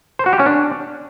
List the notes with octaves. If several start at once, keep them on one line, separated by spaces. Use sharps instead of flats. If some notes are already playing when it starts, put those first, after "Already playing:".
C5
F#4
G4
C#4
D4